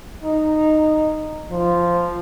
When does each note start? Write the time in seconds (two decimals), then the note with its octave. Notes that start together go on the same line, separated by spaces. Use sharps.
0.23 D#4
1.51 F3